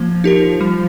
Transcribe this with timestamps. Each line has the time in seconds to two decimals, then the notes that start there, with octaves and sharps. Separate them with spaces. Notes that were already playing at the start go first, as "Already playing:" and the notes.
Already playing: F3 A#3
0.24 D#4 G4 A#4
0.61 G3